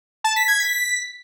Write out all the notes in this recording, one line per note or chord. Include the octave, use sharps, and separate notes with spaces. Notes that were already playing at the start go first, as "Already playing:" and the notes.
A5
B6
G#6
B6